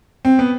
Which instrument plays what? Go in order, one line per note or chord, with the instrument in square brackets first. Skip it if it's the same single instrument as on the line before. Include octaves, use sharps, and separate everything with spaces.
[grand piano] C4
B3